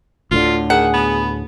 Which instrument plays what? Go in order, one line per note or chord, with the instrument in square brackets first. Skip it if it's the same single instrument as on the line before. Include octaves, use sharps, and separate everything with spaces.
[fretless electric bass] D2 A2 D3 [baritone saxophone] F4
[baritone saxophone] D#3 [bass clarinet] G#4 [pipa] F#5
[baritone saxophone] B3